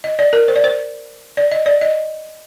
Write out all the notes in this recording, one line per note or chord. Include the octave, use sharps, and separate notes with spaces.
D#5
D5
A#4
C5
D5
C5
D5
D#5
D5
D#5